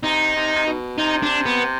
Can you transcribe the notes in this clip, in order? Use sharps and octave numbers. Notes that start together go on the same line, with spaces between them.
C3 D#4
C3
C3
B2
C3 D#4
D4
B3